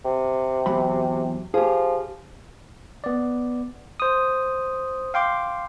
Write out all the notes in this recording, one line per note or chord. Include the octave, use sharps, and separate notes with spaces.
C3
E2 F#3 B5
F3 G4 G#4
B3 D5
C5 D#6
F5 G5 C6 D6